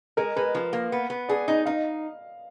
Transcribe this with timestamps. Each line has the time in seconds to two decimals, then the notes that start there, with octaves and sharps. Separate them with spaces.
0.17 G#3 A#4
0.36 G#3 B4
0.55 F3
0.73 A#3
0.92 B3
1.10 B3
1.29 G#4 D5
1.48 D#4 D#5
1.65 D#4 F5